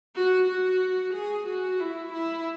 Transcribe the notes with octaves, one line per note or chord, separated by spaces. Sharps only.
F#4
F#4
G#4
F#4
E4
E4